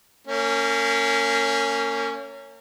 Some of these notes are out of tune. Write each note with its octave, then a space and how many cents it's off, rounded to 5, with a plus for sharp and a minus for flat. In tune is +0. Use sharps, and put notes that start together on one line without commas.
A#3 -35 C#4 +0